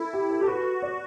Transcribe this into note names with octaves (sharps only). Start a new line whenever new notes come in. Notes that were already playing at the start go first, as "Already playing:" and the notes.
Already playing: E4 A4
G4
A4
G4 A4
F#4 B4
D5